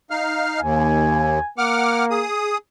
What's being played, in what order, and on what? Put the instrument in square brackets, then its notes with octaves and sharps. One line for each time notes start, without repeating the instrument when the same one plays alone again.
[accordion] D#4 F5 F6
[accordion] D#2 [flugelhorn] G#5
[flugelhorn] A#3 [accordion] F#5 D6 F6
[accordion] G#4 D#6